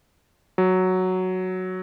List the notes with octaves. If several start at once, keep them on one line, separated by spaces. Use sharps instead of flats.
F#3